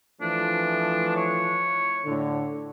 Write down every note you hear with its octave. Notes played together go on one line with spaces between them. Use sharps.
E3 F3 A3 D4
C#5
A2 D3